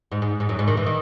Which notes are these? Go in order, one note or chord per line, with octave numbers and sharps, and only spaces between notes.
G#2
G#2
G#2
F#2
G#2
D#3
E3
D#3